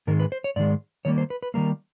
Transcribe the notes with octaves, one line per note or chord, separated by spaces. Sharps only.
G#2 D#3 G#3 A#4
B4
C5
C#5
G#2 D#3 G#3 D5
D#3 G3 A#3 C#5
C5
B4
B4
D#3 G3 A#3 A#4